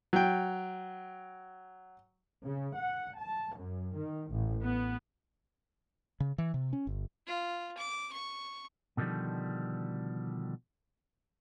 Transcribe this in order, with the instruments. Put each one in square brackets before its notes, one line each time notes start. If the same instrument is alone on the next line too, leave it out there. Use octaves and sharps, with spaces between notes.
[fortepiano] F#3 G5
[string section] C#3
F#5
A5
F#2
D#3
A1
B3
[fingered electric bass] C#3
E3
C3
C#4
G1
[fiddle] F4
D6
C#6
[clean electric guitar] B2 D3 D#3 F3 G3